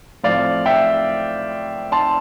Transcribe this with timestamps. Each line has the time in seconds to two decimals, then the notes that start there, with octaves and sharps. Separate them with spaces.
0.24 A2 F3 C4 D5 F5
0.66 E5 G5
1.92 A5 C6